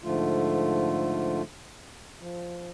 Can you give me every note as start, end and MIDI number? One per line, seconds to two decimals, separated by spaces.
0.04 1.42 44
0.04 1.42 50
0.04 1.42 53
0.04 1.42 57
0.04 1.42 65
2.21 2.70 53